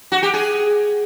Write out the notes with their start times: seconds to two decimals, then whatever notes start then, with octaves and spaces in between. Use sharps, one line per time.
0.12 F#4
0.23 G4
0.34 G#4